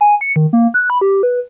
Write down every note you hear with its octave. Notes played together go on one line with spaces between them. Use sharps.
G#5
C#7
D#3
A#3
F#6
B5
G4
B4